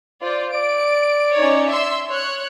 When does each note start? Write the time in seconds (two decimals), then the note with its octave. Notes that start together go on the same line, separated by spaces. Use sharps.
0.22 F4 C5 D5
0.54 D5 D7
1.36 C#4 D#4 C#5
1.70 E5 C6 E6
2.08 C#5 F#6